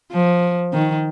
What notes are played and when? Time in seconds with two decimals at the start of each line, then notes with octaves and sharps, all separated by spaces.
0.12 F3
0.73 D#3